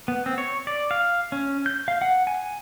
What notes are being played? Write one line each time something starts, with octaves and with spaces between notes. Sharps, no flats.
B3
C4
C#5
D5
F5
C#4
G6
F5
F#5
G#5